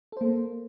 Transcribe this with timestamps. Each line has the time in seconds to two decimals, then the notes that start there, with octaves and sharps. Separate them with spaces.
0.12 A4
0.17 C5
0.21 A#3